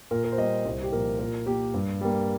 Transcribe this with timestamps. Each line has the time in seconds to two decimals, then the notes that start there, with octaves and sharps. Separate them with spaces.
0.11 A#2 A#4
0.25 A#4
0.32 C5
0.38 G3 A#3 D#5
0.65 C2 C5
0.84 G4
0.92 A#2 F3 A#4
1.19 A#2 A#4
1.46 A#3 G4
1.74 G2
2.01 G3 A#3